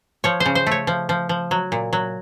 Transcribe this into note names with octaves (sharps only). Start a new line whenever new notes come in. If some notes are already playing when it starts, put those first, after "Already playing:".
F3 C#5
C5
C#3
C5
A3 C#5
F3
F3
F3
F#3
A#2
F#3